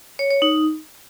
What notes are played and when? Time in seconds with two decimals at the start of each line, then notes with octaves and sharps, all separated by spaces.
0.19 C#5
0.31 C#5
0.42 D#4